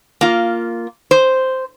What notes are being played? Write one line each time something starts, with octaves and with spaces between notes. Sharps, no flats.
A#3 F4
C5